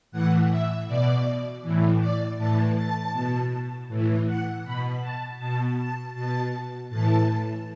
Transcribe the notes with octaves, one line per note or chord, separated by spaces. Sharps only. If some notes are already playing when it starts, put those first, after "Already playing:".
A2 E3 F#5
E5
B2 D5
A2 E3
D5
A2 E3 A5
A5
B2
A2 E3
F#5
B2 B5
A5
B2 A5
A5
B2 A5
A2 E3 A5